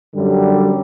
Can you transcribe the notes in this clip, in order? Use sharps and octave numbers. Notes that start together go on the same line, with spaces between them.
F#2 D3 G3